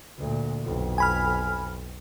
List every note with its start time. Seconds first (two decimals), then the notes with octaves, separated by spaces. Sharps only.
0.18 D2 A#2
0.63 B1 F2
0.98 G#5 B5 F6